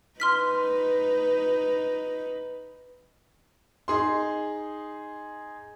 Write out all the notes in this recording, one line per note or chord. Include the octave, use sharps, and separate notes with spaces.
D#4 B4 C6 F6 B6
D#4 G#4 C6